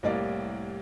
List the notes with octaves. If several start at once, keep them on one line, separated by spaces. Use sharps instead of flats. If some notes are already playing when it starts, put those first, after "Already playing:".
C2 A2 G3 A#3 D5 F5